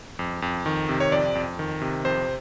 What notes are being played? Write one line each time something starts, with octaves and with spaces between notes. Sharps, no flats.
F2
F2
D#3
C3
C#5
F2 D5
F2
D#3
C3
F2 C5